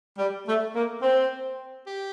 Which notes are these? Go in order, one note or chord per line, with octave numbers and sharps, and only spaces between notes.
G3
A3
A#3
C4
G4